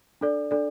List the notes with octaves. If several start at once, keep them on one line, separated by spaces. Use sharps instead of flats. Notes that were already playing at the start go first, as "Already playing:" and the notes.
D4 A4 D5
D4 A4 D5